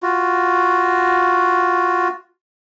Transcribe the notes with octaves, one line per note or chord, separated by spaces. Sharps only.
F4 F#4